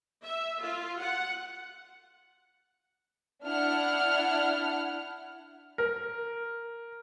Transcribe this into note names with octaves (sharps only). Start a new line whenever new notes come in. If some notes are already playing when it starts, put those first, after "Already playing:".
E5
F4
F#5
D4 E4 F#5 F6
A#4